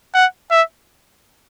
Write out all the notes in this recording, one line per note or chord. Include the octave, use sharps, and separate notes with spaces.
F#5
E5